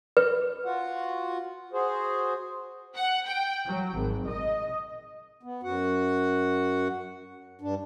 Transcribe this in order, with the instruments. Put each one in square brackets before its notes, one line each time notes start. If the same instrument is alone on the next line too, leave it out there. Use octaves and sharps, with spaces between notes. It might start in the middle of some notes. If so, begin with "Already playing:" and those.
[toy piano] B4
[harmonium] F4 F#4 F#5
F#4 G#4 C5
[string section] F#5
G5
F#3
G#1
D#5
[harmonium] B3
F#2 F#4 F#5
G2 D4